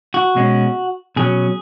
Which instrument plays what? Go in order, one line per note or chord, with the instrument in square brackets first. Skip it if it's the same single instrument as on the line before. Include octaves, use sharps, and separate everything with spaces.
[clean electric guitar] F#4
B2 G#3 C#4
B2 F#3 C#4 G#4